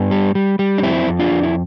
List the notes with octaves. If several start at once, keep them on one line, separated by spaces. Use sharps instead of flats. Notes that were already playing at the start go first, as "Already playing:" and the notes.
Already playing: G2 B3
G3
G3
G3
D4
F2 C4 E4
F2
D4 F4
F2
E4